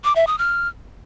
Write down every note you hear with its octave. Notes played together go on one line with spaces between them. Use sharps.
D6
E5
D#6
F6